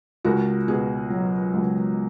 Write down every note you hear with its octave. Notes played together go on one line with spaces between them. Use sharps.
C#2 F#4 A#4
B2 G#4
F#3
C#2